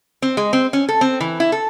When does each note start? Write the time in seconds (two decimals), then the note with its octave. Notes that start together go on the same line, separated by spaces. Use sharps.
0.22 C4
0.37 G#3
0.53 C4
0.73 C#4
0.89 A4
1.01 C4
1.21 E3
1.40 E4
1.52 A4